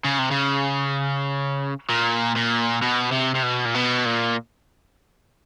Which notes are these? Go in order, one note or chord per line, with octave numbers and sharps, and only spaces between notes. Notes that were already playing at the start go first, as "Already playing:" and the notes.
C#3
C3
C#3
A#2
A#2
B2
C3
C3
B2
A#2
B2
A#2